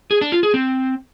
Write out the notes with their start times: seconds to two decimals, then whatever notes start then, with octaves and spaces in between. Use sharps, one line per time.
0.11 G#4
0.21 D4
0.32 F4
0.43 G#4
0.54 C4